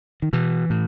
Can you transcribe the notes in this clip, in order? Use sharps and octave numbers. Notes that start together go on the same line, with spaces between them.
D#3
B2 E3
A2